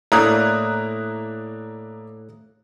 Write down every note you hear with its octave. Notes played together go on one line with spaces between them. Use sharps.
A2 A#3 D4 E4 A#5 D#6 F#6